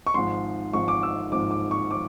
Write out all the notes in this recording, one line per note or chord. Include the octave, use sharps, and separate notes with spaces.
C#6
G#1 G#2 F3 C6
G#1 G#2 F3 C#6
D6
E6
G#1 G#2 F3 D6
D6
C#6
F3 D6